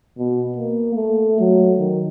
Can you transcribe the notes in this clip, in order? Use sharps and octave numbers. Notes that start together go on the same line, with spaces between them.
B2
A#3
A3
F#3
D#3